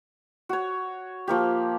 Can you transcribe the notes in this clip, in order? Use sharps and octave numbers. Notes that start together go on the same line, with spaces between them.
F#4 C#5
F3 A#3 G4